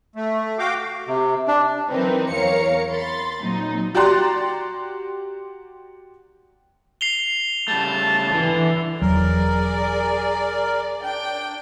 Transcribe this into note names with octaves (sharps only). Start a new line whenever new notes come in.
A3
F#4 F5 G5 D6
C3
D4
E3 F#3 C4 D#4 A#4 B4
E2 A#4 C#5 F5 C#7
B5 C6 A6
A#2 F#3 C4 D#4
F#4 G4 D5 A#5 C6 F#6
C7 F7 G7
C#3 G3 A3 A5
D3 E3
E1 E2 F#3 G#4 A#4 D5
D4 G5